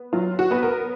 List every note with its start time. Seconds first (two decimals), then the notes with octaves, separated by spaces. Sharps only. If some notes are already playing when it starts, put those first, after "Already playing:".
Already playing: B3
0.13 F#3 F4
0.39 F#4
0.51 B3 B4
0.63 A#4